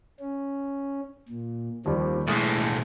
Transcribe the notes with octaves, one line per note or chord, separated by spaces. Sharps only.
C#4
A#2
D#2 D#3 F3 G3 C4
B1 A2 E3 G#3 A3 E4 D#6